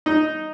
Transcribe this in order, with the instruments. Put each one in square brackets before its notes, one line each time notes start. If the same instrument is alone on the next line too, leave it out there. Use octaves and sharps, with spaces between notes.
[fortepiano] D#4